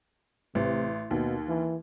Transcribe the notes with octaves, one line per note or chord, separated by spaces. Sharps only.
A1 C3
D#2 B2
E3